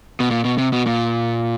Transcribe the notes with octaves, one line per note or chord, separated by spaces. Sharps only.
B2
A#2
B2
C3
B2
A#2